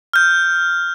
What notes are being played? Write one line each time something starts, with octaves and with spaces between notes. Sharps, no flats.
F6 G6